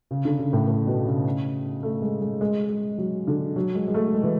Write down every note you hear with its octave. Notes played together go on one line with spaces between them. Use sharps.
C#3
D3
C#3
A2
A2
B2
C#3
A3
G#3
G#3
G#3
G#3
F#3
D3
F#3
G#3
G#3
A3
G#3
E3